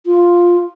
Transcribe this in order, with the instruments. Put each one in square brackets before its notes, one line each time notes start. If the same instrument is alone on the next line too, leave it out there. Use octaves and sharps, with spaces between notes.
[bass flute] F4